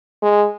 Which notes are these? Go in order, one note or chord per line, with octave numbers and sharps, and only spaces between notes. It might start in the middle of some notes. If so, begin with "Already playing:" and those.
G#3